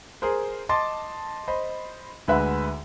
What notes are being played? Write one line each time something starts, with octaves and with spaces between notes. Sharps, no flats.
G#4 A#4 C5
D#5 A5 C6 D6 A6
C5 D#5 B5
D2 G#3 B4 E5 F#5 B5